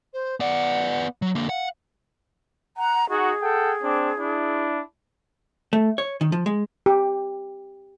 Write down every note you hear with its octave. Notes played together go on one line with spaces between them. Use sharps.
C5
B3 D5 F#5
F#3
D3 A#3
F5 F#5
F#5 A#5
D#4 F#4 G#4
A4 F#5 G5
C4 D4 D6
D4 E4
A3
C#5
D#3
F3
G#3
G4